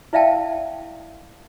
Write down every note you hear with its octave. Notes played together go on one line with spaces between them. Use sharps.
E4 D5 E5 F5 G5 A5